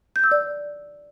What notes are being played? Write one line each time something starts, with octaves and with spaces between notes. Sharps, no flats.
G6
E6
D5